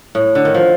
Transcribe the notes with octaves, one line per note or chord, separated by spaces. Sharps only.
A2
D3
D#3
F3